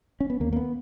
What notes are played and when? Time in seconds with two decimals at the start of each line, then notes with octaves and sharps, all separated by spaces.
0.20 C#4
0.30 B3
0.40 D#2 A#3
0.53 A#3
0.56 B3